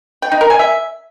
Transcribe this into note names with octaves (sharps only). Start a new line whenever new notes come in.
G5
D#4
A#4
G#5
E5